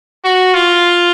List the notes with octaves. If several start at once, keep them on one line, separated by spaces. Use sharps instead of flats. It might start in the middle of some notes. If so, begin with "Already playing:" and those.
F#4
F4